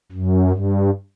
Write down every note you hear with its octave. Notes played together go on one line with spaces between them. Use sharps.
F#2
G2